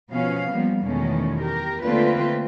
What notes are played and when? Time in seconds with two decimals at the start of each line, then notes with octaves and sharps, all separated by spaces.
0.11 B2 F3 B3 C#4 F5
0.51 F3 G3 A#3 B3
0.83 E2 B2 D#3 G#3 A3 C#4
1.41 G4 A#4
1.83 D3 A3 A#3 C4 F4 B4